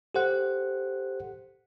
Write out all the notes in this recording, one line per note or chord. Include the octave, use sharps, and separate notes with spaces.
G4 A4 C5 F#5 F#6